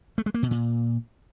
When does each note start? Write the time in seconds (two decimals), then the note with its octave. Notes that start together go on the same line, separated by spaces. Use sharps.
0.18 A3
0.26 G#3
0.34 A#3
0.43 B2
0.51 A#2